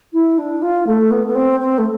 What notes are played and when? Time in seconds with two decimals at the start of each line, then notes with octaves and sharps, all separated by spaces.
0.12 E4
0.38 D4
0.62 F4
0.86 A3
1.10 B3
1.27 B3
1.35 C4
1.60 C4
1.78 A3